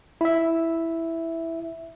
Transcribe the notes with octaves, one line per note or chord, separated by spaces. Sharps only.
E4 E5